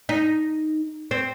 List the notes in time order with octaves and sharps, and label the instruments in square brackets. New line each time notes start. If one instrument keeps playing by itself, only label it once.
[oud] D#4
C4